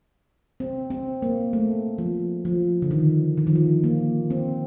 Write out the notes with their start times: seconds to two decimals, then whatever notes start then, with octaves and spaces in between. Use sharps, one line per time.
0.60 C4
0.90 C4
1.22 A#3
1.53 A3
1.98 F3
2.45 F3
2.82 D3
2.91 D#3
3.37 D#3
3.47 F3
3.56 D#3
3.84 A#3
4.30 C4